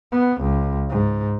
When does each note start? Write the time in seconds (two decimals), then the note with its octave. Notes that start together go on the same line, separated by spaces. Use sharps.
0.12 B3
0.42 C#2
0.90 G#2